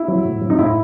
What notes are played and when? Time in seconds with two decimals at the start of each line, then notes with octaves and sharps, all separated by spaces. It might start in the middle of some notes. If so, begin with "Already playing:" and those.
Already playing: E4
0.08 F#3
0.25 A2
0.41 F#3
0.50 D#4
0.58 A2 E4